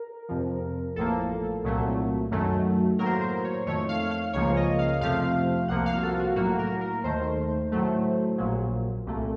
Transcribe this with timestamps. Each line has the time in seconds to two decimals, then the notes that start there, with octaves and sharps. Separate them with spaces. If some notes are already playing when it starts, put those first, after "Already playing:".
Already playing: A#4
0.29 F2 C3 F3
0.96 A1 A2 F3 A#3 A4
1.64 C2 A#2 F#3 A3
2.31 F#2 D#3 F#3 A3
2.99 A2 F#3 A#3 A#4
3.05 C5
3.13 A#4
3.21 C5
3.44 C#5
3.66 F2 D#3 A3 C#5
3.89 F5
4.11 F5
4.33 C#2 C#3 F3 A#3 C#5
4.56 D#5
4.79 F5
5.01 F2 C3 F3 A3 F5
5.68 C2 C3 F3 A#3 F#5
5.86 F5
5.95 F#4
6.03 A4
6.14 F4
6.19 F#4
6.36 A2 F#3 A#3 F#4
6.59 A#4
6.81 A#4
7.04 D#2 D#3 A3 C5
7.72 A2 F#3 A3
8.38 A#1 A#2 F#3
9.06 C2 A#2 A3